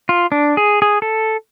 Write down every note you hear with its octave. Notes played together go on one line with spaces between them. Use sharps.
F4
D4
G#4
G#4
A4